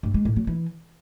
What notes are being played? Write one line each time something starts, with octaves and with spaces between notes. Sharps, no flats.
G2
G#3
A2
F#3
E3